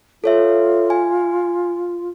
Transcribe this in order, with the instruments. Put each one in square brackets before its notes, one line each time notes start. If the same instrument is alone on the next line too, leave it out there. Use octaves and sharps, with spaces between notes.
[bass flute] F4 [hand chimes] A4 C#5 E5
[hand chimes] G#5